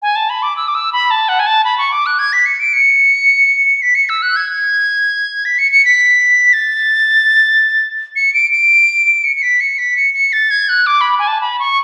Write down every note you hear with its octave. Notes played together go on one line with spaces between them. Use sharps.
G#5
A5
B5
D6
E6
D6
E6
B5
A5
F#5
G#5
A5
B5
C#6
D6
F#6
G#6
B6
C#7
D7
C#7
B6
C#7
E6
F#6
G#6
B6
C#7
C#7
B6
A6
C#7
D7
D7
C#7
C#7
B6
C#7
B6
C#7
C#7
A6
G#6
F#6
D6
B5
G#5
A5
B5
C#6